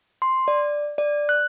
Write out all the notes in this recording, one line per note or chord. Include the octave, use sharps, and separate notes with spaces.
C6
D5
D5
F#6